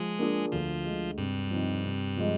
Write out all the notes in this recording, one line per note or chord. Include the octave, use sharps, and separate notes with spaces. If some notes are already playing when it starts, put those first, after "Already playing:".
Already playing: F3 G#3
A#3 D4 F4 G#4
D2 F3
D3 G#3
G2 C3
F3 C4 D#4
C3
F3 G#3